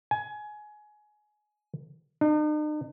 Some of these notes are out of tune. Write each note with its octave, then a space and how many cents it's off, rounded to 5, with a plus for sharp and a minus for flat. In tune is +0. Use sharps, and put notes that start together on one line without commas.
G#5 +20
D#4 -45